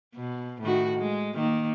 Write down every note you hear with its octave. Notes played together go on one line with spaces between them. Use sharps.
B2
A2 D#3 F#4
G#3
D#3 A#3